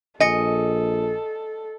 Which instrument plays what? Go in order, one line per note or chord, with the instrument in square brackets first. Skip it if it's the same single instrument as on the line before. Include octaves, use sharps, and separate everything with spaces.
[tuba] A#1 [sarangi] A4 [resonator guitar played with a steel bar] D#5 [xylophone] G#5 A#6 C#7